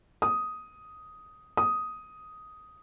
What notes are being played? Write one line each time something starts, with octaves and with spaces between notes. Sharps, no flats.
D#6
D#6